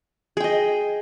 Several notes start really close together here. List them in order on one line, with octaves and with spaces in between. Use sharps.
G#4 G5 D#5